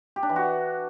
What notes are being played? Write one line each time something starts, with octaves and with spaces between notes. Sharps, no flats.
G4
D4
E3
F#4